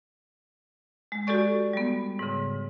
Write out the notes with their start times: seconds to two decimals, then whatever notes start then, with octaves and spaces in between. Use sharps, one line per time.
1.12 G#3
1.27 F#4 G4 A4 D5 C#6
1.73 G3 B3
2.19 G#2 C#3